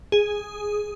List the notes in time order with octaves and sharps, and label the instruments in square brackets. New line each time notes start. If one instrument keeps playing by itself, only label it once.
[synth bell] G#4